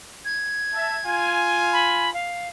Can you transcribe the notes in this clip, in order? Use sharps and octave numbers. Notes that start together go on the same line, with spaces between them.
G#6
E5 A5
F4 G#5
B5
F5